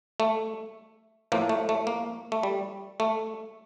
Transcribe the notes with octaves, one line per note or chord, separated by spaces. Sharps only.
A3
A2 F3 A#3
A3
A3
A#3
A3
G3
A3